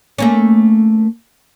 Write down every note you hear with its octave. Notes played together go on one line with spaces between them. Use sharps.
A3 A#3 C#4